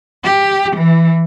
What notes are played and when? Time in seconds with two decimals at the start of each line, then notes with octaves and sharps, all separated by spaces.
0.24 G4
0.76 E3